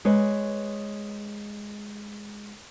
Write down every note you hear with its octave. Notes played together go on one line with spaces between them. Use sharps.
G#3 B4 C#5